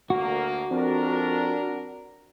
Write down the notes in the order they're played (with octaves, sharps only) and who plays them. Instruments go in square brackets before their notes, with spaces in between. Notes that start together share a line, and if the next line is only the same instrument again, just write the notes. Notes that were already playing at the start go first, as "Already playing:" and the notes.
[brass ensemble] D2 A#3 [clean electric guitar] F#4
[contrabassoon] F2 [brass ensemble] D4 A#4